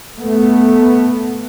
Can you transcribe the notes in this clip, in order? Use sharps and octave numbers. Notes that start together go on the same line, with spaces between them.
A3 B3